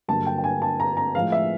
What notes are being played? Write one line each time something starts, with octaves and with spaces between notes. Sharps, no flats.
G2 D3 F#3 A#3 A5
G5
G5
G#5
A5
A#5
A#5
A2 F3 G#3 F5
E5